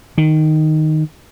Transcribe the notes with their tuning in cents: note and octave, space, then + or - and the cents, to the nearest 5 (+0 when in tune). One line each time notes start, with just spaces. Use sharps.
D#3 -5